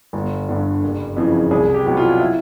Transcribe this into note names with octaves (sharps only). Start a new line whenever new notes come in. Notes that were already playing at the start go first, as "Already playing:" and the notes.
G1
G2 D3
F#1
F2 C#3 E3
C2 G#4
G4
B2 F#3
F4
E4